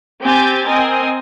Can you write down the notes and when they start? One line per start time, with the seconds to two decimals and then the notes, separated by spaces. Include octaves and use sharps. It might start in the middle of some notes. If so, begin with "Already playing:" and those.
0.24 C4 G4 G#5 G6 A6
0.67 C4 A#4 D#5 G#5